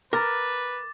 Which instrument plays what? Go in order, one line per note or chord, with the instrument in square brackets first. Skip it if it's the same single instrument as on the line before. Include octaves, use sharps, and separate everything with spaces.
[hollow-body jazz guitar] A#4 [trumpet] B4 [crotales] D6 A6